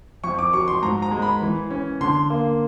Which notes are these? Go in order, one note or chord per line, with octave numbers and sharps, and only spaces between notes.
F2 C#6
D6
F#3 C#6
C6
G#2 A#5
A#5
G#3
B5
E3
C#4
D3 C6
A#3